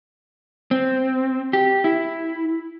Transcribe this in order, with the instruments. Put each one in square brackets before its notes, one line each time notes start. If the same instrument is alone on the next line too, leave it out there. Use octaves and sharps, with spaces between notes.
[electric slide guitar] C4
G4
E4